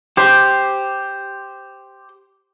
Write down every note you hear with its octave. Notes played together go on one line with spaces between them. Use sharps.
G4 C5